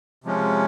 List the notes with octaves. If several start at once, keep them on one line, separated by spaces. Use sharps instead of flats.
C3 F3 G#3 C#4